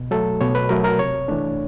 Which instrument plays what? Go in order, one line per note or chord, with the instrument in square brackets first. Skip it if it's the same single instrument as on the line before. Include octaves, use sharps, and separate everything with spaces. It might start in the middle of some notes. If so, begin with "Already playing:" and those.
Already playing: [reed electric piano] B2
F#3 A3 A4
B2 C#5
B4
F#3 A3 A#4
A#4
C3 C#5
E3 A3 D4